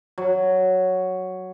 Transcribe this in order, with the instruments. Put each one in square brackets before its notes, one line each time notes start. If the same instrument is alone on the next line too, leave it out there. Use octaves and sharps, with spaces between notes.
[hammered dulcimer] F#3